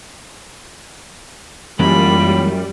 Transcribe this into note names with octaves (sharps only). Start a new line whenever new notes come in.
F#2 E3 G3 G#3 A#3 F4 B5